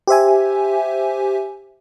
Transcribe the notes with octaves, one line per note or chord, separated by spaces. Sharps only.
G4 C5 E5 G#5